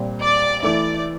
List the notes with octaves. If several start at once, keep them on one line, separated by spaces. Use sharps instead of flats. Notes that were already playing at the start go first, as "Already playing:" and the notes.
Already playing: A#2 G3 C4
D5
E3 A3 E4 D5